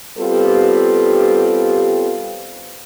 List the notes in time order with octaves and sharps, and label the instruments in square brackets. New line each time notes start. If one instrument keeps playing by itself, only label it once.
[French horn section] G3 B3 C4 F4 G4 A4